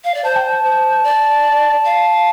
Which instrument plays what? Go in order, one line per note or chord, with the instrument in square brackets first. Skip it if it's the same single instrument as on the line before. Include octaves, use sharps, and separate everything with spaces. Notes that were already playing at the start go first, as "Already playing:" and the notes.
[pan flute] F5
D5
[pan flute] C5 [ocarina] A5
[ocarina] G5
A5
[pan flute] C5
D5
F5